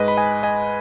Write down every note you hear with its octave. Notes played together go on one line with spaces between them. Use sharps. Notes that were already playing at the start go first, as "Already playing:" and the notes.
Already playing: G#2 G#3 B4 D#5
B5
D#5 G#5
D#5 G#5